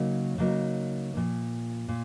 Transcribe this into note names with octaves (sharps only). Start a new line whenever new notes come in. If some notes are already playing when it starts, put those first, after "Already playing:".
Already playing: C#3 F#3 A#3 D#4 A#4
C#3 F#3 A#3 D#4 A#4
A#2 F3 A#3
A#2